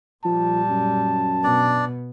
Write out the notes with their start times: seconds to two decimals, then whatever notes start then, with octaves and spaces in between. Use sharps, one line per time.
0.25 A#2 F3 G3 A5
0.69 F#2
1.44 B2 B3 D4 D5